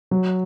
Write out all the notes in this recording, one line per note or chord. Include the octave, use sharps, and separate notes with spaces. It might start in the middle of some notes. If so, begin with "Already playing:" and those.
F#3